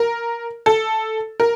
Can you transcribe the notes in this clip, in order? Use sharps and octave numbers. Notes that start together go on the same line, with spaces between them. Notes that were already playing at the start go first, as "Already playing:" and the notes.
Already playing: A#4
A4
A#4